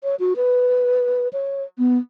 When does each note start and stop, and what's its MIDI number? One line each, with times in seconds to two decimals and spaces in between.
0.03 0.15 73
0.20 0.33 66
0.36 1.28 71
1.33 1.63 73
1.78 1.97 59